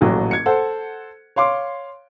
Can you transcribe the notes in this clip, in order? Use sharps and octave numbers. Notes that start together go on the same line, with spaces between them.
D#1 A1 F#3
G#6 C#7
A4 C5 F#5
C#5 F5 C6 D6